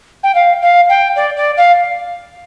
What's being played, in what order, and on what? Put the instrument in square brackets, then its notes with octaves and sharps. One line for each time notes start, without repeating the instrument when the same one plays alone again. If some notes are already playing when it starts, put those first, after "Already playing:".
[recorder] G5
F5
F5
G5
D5
D5
F5